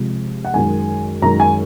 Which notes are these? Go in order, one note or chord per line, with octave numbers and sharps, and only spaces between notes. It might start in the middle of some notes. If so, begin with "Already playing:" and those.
Already playing: C3 F3 G#3
F#5
F#2 D#3 G#3 G#5
F#2 D#3 G#3 A#5
G#5